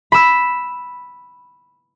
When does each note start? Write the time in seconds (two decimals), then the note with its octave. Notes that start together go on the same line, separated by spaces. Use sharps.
0.12 B5 E6